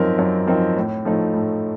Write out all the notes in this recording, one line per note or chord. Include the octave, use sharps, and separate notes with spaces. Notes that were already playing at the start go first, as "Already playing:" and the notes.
Already playing: F#2 F3 C4 D#4 A#4
F#2
F3 C4 D#4 A#4
A2
F3 A3 D#4
A2